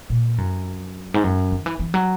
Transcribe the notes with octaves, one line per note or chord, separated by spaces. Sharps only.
A#2
F#2
G#2
F#2
D#3
E3
E3
F#3